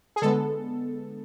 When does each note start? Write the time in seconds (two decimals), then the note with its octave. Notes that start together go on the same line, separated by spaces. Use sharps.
0.16 G#4
0.22 D3 G#3 B3 A4